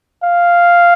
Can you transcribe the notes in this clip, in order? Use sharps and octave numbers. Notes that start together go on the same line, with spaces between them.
F5